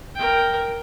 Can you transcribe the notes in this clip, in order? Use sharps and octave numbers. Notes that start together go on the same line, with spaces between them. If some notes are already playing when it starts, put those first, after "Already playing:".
A#4 G5